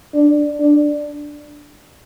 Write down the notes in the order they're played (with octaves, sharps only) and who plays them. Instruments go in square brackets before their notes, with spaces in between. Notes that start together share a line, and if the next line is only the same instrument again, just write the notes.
[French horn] D4
D4